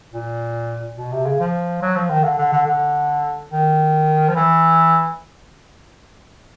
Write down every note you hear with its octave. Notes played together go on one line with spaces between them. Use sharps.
A#2
B2
C3
C#3
F3
F#3
F3
D#3
D3
D3
D3
D3
D#3
F3
E3